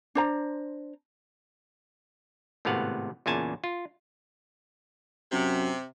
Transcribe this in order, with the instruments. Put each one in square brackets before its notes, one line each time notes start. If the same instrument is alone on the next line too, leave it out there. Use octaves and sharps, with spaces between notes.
[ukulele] D4 C5 A#5
[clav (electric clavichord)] G#1 A2 C3 B3 F5 F#5
E2 A#2 C#3 G#5 A5
F4
[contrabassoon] F#2 [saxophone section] C3